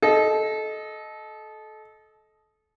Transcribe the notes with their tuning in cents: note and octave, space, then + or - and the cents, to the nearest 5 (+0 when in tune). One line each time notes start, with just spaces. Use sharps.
A4 -25 D#5 +0